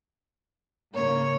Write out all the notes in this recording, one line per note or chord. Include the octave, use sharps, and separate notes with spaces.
G#2 C#3 A#3 C#5